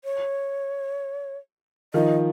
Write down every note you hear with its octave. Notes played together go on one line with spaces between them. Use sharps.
C#5
D#3 F3 D#5